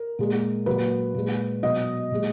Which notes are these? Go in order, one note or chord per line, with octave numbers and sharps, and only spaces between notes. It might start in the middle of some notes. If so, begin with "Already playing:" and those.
Already playing: A#4
A#2 G#3
A#2 F#3 B4
A#2 G#3
B2 F#3 D#5
A#2 G#3